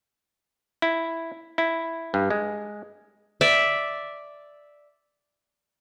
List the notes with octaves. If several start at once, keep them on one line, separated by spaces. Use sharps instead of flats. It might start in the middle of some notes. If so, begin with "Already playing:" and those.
E4
E4
G2
G#3
D5 E5